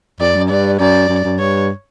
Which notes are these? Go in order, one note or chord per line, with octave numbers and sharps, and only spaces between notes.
F2 D5
F#2
G2 D5
F#2 D5
F#2
F#2
G2 C#5